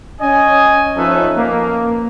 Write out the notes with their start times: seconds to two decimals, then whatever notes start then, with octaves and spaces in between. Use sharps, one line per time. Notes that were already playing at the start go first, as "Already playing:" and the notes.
0.21 C#4 D#5 G#5
0.97 F3 C#4 D#4 A4 B4 E5
1.36 A#3